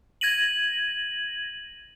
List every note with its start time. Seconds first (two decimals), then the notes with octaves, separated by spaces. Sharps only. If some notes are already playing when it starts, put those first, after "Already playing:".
0.21 G#6 A#6 D#7 F#7